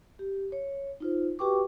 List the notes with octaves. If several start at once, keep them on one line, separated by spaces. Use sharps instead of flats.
G4
C#5
D#4 F4 C5
F#4 G4 B4 G5 C#6 D6